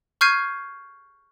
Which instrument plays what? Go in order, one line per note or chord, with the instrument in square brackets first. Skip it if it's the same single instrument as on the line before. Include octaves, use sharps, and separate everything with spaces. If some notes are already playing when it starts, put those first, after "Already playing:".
[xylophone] C#6 F6 G6 G#6 C7 D#7